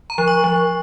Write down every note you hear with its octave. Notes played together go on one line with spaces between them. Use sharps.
A#5
F3
C#6
F3